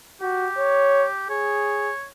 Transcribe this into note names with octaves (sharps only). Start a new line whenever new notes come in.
F#4 G4
C#5
G#4 C#5